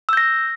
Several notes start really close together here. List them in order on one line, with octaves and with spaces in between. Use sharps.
E6 G6 A#6